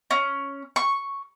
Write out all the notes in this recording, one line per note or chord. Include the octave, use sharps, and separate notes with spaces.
C#4
C#6